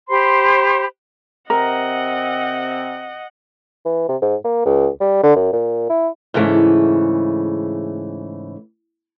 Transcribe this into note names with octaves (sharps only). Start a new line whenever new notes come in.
G4 C5 B5 C6
C3 C4 A#4 D#5 F#5
E3
C3
G#2
A#3
C#2
G3
D3
F#2
A#2
E4
G#2 C#3 E3 A3